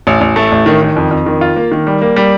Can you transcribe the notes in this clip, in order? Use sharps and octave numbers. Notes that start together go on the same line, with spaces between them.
A1
A1
A3
A1
D#3
D#3
F2
F2
D#3
F4
A#3
D#3
G3
A#3
G3